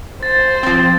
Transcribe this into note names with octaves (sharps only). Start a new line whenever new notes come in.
C5 A6
F3 C4